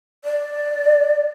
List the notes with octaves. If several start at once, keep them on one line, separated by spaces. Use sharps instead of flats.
D5